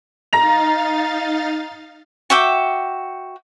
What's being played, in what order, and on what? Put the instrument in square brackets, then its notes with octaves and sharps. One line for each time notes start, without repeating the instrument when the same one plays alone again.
[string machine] D#4 F5 A6 [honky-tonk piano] A#5 A#6 F7
[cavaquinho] F#4 E5 G5 D6